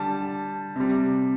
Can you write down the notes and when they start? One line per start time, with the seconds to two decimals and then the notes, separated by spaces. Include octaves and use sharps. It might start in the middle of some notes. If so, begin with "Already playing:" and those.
Already playing: D3 G3 A5
0.76 C3 G3